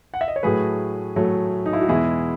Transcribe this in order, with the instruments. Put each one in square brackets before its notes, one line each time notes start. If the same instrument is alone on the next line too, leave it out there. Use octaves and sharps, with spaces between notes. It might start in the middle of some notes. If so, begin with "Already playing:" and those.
[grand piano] F#5
E5
D#5
C#5
A2 F#3 A3 G#4 B4
A2 F#3 A3
D#4
E4
F#4
E2 B2 G#3 E4 G#4